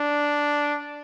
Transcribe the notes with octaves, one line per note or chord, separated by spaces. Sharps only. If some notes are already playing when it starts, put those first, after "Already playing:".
Already playing: D4